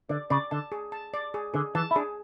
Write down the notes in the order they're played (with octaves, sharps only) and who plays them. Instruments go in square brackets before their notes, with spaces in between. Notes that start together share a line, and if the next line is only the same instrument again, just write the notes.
[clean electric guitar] D3 [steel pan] D5
[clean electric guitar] C#3 [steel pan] D5
[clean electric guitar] D3 [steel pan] A5
[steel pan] G#4
A5
D5
G#4
[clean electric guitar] D3 [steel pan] G#4
[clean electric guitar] E3 [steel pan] A5
[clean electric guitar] E4
[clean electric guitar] D4 [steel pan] G#4